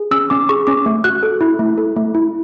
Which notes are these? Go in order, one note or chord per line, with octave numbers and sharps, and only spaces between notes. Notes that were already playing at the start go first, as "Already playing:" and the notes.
Already playing: G#4
C#4 E6
C#4 D6
G#4 C#6
C#4 D6
A3
F#4 F#6
A4
E4
A3
A4
A3
E4